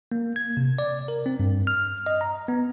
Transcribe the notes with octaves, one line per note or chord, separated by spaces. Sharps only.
A#3
G#6
C3
D5
A#4
C4
G2
F6
D#5
A#5
B3